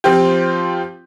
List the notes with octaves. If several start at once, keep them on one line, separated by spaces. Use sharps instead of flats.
F3 C4 F4 G4